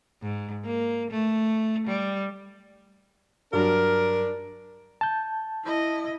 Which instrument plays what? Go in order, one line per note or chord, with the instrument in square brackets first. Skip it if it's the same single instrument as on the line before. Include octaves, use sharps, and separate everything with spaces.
[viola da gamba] G#2
A#3
A3
G3
[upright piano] G2 F#3 [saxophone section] D4 A#4
[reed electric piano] A5 G6
[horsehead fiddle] E4 D#5